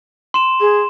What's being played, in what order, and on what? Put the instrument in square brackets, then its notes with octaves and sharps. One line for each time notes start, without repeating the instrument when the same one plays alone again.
[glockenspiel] C6 E7
[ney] G#4